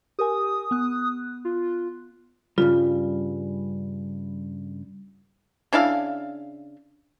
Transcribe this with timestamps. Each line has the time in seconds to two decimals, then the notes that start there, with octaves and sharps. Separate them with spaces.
0.19 G4 A#4 G#5 D#6
0.71 B3 F#6
1.45 F4
2.58 G2 C#3 G3 F4
5.73 C#3 D4 E4 F5